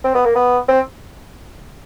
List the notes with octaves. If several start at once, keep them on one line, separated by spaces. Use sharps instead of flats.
C4
B3
A#3
B3
C4